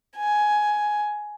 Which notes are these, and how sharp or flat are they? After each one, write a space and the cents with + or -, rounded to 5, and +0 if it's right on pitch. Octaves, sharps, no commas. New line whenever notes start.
G#5 +10